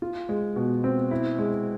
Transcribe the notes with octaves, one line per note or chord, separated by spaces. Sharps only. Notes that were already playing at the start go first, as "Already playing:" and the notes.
F4
G#3
B2
C4
E4
G#3